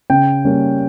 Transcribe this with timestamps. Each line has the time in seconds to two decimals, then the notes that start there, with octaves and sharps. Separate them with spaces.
0.10 C#3 G5
0.45 G3 A#3 C#4